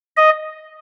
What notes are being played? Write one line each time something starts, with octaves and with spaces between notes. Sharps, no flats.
D#5